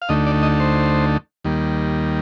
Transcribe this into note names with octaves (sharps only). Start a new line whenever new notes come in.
F5
D2 D3 A3 D#4 D#5
D5
D#5
C5
D#2 D#3 G3 A#3